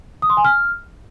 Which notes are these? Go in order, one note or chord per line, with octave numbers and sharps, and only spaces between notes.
D#6
C6
G#5
F6